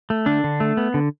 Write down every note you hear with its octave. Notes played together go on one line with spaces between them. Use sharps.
A3
D3 D4
D3
A3
B3
D3